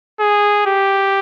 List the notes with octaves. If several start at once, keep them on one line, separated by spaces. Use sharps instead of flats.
G#4
G4